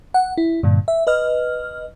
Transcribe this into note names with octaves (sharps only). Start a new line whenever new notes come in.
F#5
E4
G2 A#2 D3
E5
B4 D#5 F6